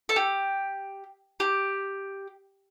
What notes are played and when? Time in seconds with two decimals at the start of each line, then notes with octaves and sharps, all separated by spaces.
0.09 A4
0.16 G4
1.40 G4